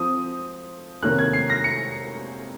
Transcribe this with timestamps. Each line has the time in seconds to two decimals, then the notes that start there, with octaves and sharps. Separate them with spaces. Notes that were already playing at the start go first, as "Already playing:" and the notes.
Already playing: F3 C4 D#6
1.03 C3 D#3 A#3 C#4 F#6
1.18 G#6
1.33 C7
1.50 A#6
1.64 C#7